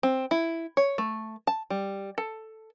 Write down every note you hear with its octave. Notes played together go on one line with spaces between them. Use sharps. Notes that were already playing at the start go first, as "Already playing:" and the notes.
C4
E4
C#5
A3
A5
G3
A4